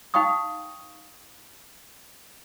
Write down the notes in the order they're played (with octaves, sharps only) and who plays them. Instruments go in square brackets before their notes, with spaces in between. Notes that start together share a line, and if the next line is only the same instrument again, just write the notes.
[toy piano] D#4 F5 G5 C#6 D#6